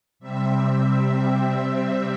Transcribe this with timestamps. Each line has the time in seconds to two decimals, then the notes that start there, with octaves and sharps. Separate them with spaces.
0.19 C3 G3 C4 E5